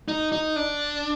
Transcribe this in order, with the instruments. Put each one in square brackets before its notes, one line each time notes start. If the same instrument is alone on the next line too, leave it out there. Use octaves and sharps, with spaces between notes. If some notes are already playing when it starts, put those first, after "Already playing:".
[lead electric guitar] D#4
D#4
D4